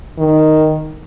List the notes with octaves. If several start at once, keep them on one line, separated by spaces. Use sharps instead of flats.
D#3